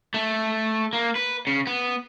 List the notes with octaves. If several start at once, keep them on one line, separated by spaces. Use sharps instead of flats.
A3
A#3
B4
C#3
B3